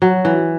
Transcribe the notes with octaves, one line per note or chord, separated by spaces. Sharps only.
F#3
E3